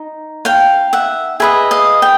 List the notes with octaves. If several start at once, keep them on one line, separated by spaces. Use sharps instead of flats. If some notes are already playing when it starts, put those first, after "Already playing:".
Already playing: D#4
F5 G5
E5 F#5
G#4 B4 D#5 E5
D#5 F5
G5